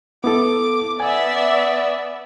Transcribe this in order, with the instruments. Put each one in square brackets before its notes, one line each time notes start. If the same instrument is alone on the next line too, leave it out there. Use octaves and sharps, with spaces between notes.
[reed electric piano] B3 E4 A4 [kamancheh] D6
[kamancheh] B3 [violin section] D5 E5 [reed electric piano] G#5